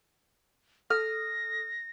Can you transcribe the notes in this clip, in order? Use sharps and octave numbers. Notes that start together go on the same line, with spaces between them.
A4 D#6 F6 A#6